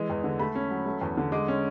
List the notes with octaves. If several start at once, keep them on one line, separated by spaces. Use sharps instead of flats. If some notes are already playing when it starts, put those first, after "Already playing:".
Already playing: E3 G#3
E2
D3
A3 B5
C#4
F#3
A3
E2
D3
G#3 D6
C#4